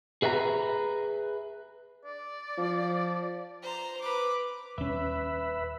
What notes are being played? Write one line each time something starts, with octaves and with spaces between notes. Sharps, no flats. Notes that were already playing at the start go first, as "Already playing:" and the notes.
G#4 B4 E5 F5 A#5
D5
F3
C5 A#5
B4 D6
D#1 C#4 B4 E5